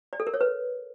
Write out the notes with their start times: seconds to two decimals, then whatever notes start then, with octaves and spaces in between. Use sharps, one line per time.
0.13 D5
0.20 A4
0.27 A#4
0.34 C#5
0.41 B4